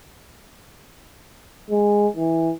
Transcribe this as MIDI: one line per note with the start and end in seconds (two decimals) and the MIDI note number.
1.70 2.07 56
2.17 2.52 52